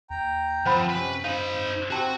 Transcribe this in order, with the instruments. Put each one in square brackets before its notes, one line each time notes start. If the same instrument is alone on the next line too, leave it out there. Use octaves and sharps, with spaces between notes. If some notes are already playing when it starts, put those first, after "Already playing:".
[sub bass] D#2 [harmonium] G5 A#5
[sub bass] F#2 [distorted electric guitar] F3 [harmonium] C4 [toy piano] C5 F#5 B5
[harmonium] C3 C#4 [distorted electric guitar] B4
[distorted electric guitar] D#4 B5 [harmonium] C5 [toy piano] F5
[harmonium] C4 [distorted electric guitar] F#4 [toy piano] G4 A5